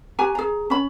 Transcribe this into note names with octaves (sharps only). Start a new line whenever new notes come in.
F#4 G4 G#5 A#5
G#4 A#5
C#4 B5